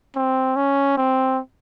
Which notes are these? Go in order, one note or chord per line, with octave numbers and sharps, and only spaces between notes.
C4
C#4
C4